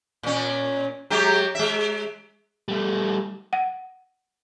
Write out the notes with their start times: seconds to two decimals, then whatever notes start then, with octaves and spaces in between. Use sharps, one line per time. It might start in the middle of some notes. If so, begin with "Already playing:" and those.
0.23 A#2 C#4
1.10 F#3 G#3 G4
1.55 G#3 E5
2.68 G3 A3
3.53 F#5